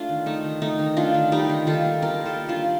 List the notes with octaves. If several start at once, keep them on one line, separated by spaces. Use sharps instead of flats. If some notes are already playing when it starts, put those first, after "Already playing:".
Already playing: A3 D4 F4
D#3
A3 D#4
D#3
A3 D#4
D#3
A3 D4 F4
D#3
G3 D#4 G4
D#3
D#3 F4 A4
A#3
G3 G4 A#4
D#3
F4 A4
D#3
D4 F4
A#3